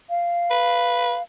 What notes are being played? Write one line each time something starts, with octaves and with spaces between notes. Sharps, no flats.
F5
B4